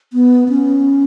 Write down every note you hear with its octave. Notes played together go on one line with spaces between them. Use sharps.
B3
C#4